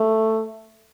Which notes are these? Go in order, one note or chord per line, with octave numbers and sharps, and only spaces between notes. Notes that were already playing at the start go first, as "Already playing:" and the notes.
Already playing: A3